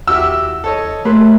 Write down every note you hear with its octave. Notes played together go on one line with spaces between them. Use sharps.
D#2 E4 F#4 G4 E5 E6
A4 C#5 D#5
A2 A3 A#3 G4 A#4 B5 C6 F#6